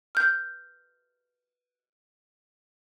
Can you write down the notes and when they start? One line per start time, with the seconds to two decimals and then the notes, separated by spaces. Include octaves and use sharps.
0.15 F6 G6